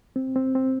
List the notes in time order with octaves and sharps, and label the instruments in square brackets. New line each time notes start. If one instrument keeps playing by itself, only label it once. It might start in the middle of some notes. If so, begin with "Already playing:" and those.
[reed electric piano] C4
C4
C4